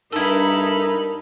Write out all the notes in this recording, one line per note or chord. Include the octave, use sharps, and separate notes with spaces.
G2 D#4 E4 A4 A#4 B5